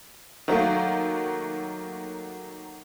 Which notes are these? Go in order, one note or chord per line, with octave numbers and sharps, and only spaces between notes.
D#3 F#3 A3 A#3